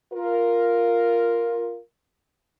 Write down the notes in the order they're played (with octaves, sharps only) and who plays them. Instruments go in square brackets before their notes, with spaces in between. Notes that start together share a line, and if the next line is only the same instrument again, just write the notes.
[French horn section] F4 A#4